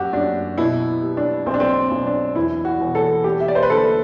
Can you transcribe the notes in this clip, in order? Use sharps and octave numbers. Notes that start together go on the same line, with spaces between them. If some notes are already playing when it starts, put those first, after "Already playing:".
Already playing: F#2 F#4 G4
F#2 D4
B2 E4
G3
D4
B1 C4
D4
C4
B1
D4
E2 E4
F#4
E1
A4
G3 G4
E5
D5
C5
B4
D3 A4